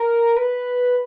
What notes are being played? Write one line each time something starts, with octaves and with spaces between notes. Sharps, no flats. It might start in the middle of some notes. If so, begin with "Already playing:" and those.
Already playing: A#4
B4